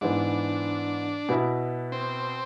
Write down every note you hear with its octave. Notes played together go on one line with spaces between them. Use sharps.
G#2 E3 B3 D4
B2 B3 E4
C4